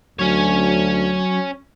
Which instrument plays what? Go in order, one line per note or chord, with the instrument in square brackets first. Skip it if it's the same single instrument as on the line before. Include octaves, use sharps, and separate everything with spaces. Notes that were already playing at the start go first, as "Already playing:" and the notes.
[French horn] D2 [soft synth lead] F#3 [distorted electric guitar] C#4 C#5